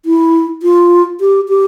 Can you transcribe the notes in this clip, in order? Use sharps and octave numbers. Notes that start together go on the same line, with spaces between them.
E4
F4
G4
G4